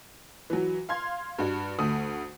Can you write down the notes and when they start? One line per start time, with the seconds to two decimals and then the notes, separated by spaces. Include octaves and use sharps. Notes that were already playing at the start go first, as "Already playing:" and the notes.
0.50 E3 F#3
0.89 F5 C6 G#6
1.39 G2 F#4
1.79 D2 A3 D#6